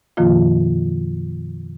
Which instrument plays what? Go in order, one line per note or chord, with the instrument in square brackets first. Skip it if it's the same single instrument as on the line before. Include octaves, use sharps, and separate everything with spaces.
[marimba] F#2 B2 D#3 F3 A#3 F4